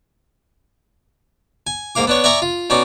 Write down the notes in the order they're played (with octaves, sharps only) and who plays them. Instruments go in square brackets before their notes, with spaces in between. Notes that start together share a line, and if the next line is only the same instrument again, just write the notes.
[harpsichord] G#5
G#2 A#3 F5 D6
B3 D4 C#5
D5 E5 G#5 A#5 C#6 D#6
F4
B2 C#4 D#4 D5